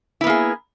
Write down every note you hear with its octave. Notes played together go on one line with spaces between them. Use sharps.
A#3 B3 E4 G#4